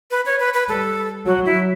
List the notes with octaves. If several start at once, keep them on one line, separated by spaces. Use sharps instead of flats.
B4
C#5
B4
B4
G3 A4
F#3 F#4
E4